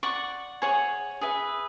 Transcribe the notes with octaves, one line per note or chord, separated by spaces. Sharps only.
D5 F#5 C#6
G#4 C#5 F#5
G#4 B4 E5